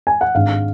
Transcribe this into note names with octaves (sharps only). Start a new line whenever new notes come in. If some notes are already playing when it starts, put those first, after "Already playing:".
G#5
F#5
G#1 G#2 G#3 D4 F5